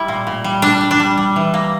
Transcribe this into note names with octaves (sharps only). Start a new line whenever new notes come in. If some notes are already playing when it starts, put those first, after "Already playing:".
Already playing: G3 E4
A#2
A#2
G3
G3 D4
G3
D4
G3
G3
E3
A#3